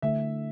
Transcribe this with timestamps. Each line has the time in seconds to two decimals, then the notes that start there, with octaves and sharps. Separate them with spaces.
0.02 D3 A3 E4 E5